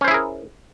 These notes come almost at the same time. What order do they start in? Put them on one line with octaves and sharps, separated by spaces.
C#4 C5 E4 G#4 A#4